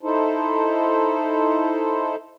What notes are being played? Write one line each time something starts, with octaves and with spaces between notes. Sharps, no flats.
D#4 E4 A4 C5